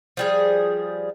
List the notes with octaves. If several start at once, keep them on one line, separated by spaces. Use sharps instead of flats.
F3 G3 G#4